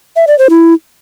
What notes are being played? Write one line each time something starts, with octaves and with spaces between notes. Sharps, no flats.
E5
D5
C5
E4